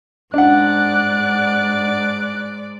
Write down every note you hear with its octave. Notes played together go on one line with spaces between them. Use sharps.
G#2 D4 D5 F#5 F#6